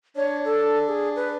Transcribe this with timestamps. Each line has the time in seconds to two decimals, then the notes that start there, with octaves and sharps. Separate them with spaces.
0.16 D4 C#5
0.45 A4
0.88 G#4
1.16 B4